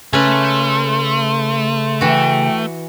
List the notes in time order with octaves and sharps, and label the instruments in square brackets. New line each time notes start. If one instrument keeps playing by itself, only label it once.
[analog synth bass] C#3 [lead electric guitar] A3 [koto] C#4 B4 [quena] C6
[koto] E3 F#4 [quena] G5